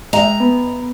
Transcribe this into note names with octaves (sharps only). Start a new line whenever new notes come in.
G#3 D#5 E5 G5 A#5
B3